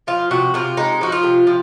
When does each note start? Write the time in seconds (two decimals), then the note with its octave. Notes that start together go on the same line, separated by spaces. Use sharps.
0.07 F3 F4
0.31 C3 F#4
0.54 C3 F4
0.77 G#3 D#4
1.01 F3 F#4
1.12 F4
1.23 C3
1.47 F3